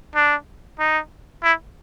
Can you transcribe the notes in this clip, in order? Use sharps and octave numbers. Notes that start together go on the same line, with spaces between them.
D4
D#4
E4